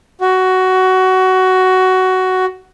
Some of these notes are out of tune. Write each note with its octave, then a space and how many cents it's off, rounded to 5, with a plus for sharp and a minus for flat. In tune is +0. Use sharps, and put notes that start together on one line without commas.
F#4 +15